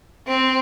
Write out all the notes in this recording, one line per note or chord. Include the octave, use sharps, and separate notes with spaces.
C4